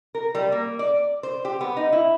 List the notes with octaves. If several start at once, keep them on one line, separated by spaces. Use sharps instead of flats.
A#4
G3
A#3
D5
C5
G4
B3
D#4
E4